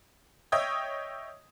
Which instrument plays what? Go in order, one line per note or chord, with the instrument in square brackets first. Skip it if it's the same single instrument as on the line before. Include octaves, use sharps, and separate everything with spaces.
[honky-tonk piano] C#5 D#5 E5 G5 D#6 G#6